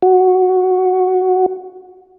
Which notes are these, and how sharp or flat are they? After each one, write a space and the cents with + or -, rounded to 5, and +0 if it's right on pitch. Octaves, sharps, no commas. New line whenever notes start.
F#4 +0